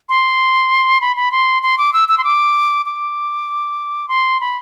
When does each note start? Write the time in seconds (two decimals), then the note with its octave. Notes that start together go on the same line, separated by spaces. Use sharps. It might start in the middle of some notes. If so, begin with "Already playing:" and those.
0.09 C6
1.01 B5
1.16 B5
1.32 C6
1.63 C6
1.78 D6
1.93 E6
2.09 E6
2.18 C6
2.24 D6
2.86 D6
4.09 C6
4.41 B5